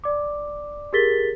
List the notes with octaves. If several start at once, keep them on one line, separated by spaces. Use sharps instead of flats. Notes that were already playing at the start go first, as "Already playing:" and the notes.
D5 D6
G4 G#4 A#4 A6 B6 G7